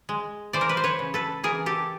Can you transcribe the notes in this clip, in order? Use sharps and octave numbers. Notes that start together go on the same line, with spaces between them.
G#3
E3 C5 D5
A#4
B4
C5
B4 C#5
C#3
A4 B4
E3 G#4 A#4
G4 A4